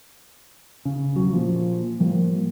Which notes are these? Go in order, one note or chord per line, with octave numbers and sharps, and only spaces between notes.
C#3
E1 F#3
A#2 F3
A2 F3 G3 A#3